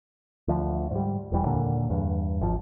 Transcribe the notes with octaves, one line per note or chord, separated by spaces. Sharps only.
D2 F3
G#2 G3
E1 E2 E3 G3
D#2 A#2 D3 A#3
E2 G2
G#1 F3